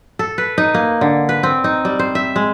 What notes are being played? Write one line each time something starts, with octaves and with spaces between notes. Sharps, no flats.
A4
B4
D#4
A#3
D3
B4
C4
D#4
G3
C5
E5
G#3